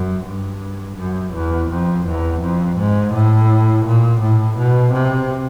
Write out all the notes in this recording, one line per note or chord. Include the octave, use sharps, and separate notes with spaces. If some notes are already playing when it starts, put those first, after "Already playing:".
Already playing: F#2
G2
F#2
E2
F2
E2
F2
G#2
A2
A#2
A2
B2
C3